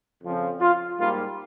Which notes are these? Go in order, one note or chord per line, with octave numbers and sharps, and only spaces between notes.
F2 C#3 F3 C4
F4
G#2 G3 A#3 F4